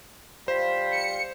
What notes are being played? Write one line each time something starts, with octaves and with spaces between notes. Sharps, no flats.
G3 F4 C5 B5
C#7